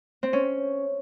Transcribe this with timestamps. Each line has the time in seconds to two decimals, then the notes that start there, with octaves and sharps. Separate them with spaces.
0.23 C4
0.33 C#4